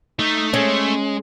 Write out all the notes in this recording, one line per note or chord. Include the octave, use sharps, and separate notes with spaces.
A3 D#4
G#3 C#4